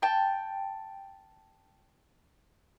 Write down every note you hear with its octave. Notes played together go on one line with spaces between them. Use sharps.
G5 A5